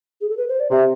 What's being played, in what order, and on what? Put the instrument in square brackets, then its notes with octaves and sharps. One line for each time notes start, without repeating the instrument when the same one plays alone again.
[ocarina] G#4
A4
B4
C5
D5
[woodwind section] C3 [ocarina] E5